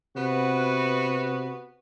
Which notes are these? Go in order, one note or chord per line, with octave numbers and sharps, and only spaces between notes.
C3 B3 F#4 B4